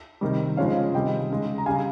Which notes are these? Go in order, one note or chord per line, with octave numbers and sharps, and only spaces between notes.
C3 D#3 G3
C#3 F3 G#3 C#5 F5
C3 D#3 G3 D#5 G5
C#3 G#3
A#5
C#3 G3 F5 G#5